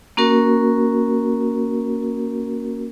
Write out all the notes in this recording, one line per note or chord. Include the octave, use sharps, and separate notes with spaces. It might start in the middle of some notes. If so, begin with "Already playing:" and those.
A#3 C#4 F#4 A#4